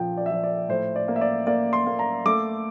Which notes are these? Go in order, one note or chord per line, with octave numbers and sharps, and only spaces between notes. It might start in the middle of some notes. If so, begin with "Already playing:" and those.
Already playing: A#2 F3 A#3 G5
D5
E5
F3 D5
D5
A2 C5
D5
A#3
E5
D5
A#3 D5
C6
A#3
A#5
A3 D6